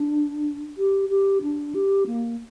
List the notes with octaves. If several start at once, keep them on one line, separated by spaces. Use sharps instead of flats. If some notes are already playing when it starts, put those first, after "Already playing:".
Already playing: D4
G4
G4
D4
G4
A#3